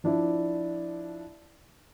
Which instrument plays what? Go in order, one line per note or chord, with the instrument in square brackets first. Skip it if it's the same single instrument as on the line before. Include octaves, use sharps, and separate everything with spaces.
[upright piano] F3 D4 E4